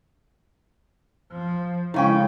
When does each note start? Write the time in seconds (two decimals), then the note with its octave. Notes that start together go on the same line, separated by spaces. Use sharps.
1.32 F3
1.94 A2 C#3 G#3 C#4 E4 F5 G5 C#6